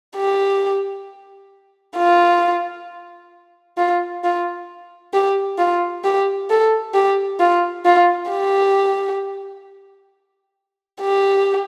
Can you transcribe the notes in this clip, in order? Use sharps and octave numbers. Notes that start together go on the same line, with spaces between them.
G4
F4
F4
F4
G4
F4
G4
A4
G4
F4
F4
G4
G4